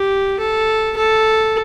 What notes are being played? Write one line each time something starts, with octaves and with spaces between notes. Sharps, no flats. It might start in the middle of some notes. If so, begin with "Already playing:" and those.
Already playing: G4
A4
A4